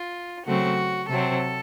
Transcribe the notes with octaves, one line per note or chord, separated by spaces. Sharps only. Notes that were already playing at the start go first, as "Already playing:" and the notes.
Already playing: F4
C#3 F#3 A3 C4 F#4
C3 F#3 C4 A4